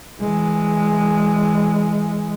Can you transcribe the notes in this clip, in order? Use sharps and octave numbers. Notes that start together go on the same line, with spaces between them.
E3 G#3